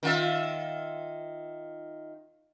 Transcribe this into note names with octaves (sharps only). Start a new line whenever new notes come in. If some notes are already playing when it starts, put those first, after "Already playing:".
D#3 F4 E5